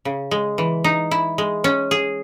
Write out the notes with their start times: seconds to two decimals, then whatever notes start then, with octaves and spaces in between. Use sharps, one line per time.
0.05 C#3
0.31 G#3
0.58 E3
0.84 D#4
1.11 E4
1.38 G#3
1.64 C#4
1.91 G#4